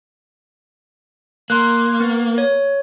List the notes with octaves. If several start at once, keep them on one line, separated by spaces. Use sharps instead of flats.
A#3 C6 F#6
B3
C#5